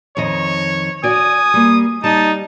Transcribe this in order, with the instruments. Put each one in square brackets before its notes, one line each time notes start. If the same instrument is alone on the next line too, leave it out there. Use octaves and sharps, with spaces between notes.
[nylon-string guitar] F2 D#3 D#5 [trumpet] C#5
[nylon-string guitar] F#4 D5 [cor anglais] G#5 [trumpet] D#6
[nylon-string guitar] G3 A#3
[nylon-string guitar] G3 [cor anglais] D#4 [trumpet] A5